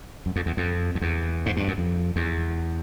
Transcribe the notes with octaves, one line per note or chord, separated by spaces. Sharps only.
F#2
F2
E2
F2
F2
E2
G#2
G2
F#2
F2
E2